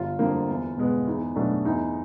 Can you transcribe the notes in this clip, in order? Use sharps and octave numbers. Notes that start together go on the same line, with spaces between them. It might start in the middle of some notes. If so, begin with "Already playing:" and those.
Already playing: G1 F4
F2 D3 G3 A#3
E2
B2 G#3 B3
E2 D#4
B2 F#3 A3 D4
E2 D#4